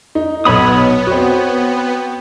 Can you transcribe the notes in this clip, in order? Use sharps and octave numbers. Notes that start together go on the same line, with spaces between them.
D#4
B1 F#3 B3 C#5 B5 D#6
C4 F#4